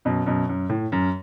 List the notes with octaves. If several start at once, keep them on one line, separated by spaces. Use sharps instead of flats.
F#2 B2
F#2 B2
F#2
A2
F#2